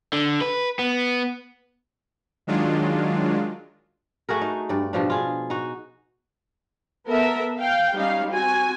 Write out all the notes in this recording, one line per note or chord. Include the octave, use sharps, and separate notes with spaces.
D3
B4
B3
D#3 F#3 G#3 D4 F4
A3 F#4 G#4 A#4
D#4
G2 D5
G2 B2 F3 D4
F4 G#4
D#4 F#4
B3 A4 A#4 E5
F5 G5
G3 C#4 D#4 F5
C4 F#4 G#5